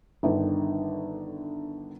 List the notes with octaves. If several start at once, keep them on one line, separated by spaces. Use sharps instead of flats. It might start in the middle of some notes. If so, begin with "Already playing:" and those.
G1 D3 D#3